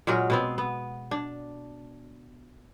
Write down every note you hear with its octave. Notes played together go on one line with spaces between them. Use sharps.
A#2 F#3 G#3 A#4
B2 B3 C4
B3
D4